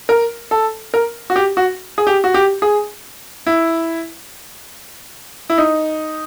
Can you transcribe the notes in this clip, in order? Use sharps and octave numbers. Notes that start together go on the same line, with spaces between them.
A#4
A4
A#4
F#4
G4
F#4
G#4
G4
F#4
G4
G#4
E4
E4
D#4